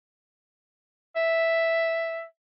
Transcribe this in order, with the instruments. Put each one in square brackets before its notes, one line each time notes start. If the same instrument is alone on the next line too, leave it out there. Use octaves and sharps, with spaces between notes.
[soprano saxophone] E5